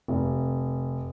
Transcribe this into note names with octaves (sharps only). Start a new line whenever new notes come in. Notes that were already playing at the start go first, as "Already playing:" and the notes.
F1